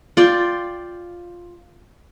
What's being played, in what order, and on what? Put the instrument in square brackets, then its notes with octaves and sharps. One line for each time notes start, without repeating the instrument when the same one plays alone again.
[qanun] F4 D5 G5